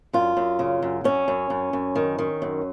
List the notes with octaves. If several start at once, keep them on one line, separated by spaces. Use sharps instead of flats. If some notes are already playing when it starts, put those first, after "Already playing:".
F#2 F4
F#2
C#3
F#2
F#2 C#4
F#2
F#2
F#2
D#3
D#3
F#2